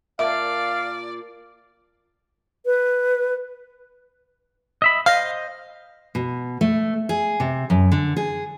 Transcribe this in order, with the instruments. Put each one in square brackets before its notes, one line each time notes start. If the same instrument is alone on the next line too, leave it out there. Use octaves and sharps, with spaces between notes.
[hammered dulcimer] A#2 A5 [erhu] D5 [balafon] E5 [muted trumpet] F5
[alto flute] B4
[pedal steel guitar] D#5 E5 B5
[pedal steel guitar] C5 D#5 [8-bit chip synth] F5
[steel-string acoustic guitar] B2
A3
G#4
C3
F#2
D3
G#4